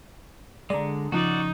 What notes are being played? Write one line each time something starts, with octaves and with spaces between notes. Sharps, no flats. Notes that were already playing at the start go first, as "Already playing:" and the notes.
D3 G#3 D5 A#5
C#3 F3 D#4 F#4 D5